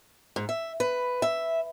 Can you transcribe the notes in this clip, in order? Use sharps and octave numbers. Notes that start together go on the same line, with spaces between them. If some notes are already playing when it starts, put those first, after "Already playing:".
G#2
E5
B4
E5